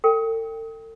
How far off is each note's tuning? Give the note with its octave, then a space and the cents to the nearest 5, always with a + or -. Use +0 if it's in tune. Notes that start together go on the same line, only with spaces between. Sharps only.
A4 +45 G5 +0